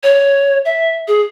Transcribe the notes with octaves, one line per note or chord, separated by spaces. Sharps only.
C#5
E5
G#4